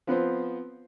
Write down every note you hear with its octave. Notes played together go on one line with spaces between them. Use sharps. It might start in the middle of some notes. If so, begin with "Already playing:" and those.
F3 B3 C4 C5